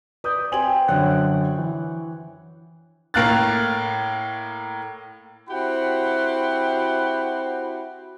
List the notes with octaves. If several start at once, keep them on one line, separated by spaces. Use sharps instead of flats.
B4 D5 D#6 G6
C4 G4 G#5 F#7
F#2 D3 C#5 F#5 F#6
E3
A2 A#3 F5 F6 F#6 A6
C4 E4 F#4 G4 F#5 B5